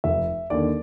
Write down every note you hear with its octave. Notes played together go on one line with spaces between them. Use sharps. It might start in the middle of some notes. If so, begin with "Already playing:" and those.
F1 E5
D#2 D3 D5